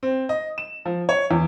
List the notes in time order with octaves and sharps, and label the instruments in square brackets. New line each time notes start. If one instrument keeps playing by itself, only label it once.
[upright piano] C4
D#5
E7
F3
C#5
E2